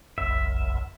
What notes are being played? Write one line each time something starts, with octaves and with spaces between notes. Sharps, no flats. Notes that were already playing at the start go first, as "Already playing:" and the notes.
F#1 B1 F2 E5